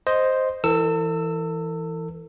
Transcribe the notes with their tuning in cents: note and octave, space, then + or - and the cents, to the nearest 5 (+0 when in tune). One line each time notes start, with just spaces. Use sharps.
C5 +0 D#5 +0
E3 +0 A4 +45 E6 +0